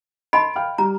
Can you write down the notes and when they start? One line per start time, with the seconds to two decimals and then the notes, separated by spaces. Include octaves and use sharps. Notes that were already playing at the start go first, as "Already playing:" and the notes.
0.33 D#5 A5 B5 C6 D7
0.56 F5 G5 F6
0.78 G3 A#5